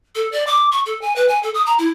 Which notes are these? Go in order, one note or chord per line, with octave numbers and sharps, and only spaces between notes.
A4
D5
D6
C#6
A4
G#5
B4
G#5
A4
D#6
A#5
E4